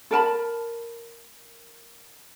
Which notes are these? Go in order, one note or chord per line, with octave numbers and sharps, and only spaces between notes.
A4 A#4 A5 B5